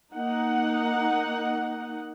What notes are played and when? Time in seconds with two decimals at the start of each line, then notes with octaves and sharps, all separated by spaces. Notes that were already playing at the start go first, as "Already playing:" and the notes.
0.15 A#3 D#4 F#5